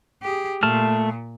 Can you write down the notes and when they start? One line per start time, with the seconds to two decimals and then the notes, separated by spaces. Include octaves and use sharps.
0.23 G4 G#4
0.63 A#2 A3 A5 F6